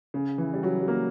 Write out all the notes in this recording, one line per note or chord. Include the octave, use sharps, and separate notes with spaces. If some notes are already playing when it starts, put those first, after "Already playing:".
C#3
E3
G3
F#3
G3
A#3